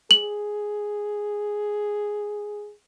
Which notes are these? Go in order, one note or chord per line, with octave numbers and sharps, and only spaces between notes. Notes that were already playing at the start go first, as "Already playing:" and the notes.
G#4 F#7